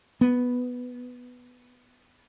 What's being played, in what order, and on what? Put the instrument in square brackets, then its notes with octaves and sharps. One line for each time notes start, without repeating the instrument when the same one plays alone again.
[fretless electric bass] B3